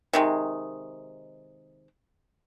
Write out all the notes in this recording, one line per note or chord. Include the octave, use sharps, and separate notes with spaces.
C3 D#3 G#3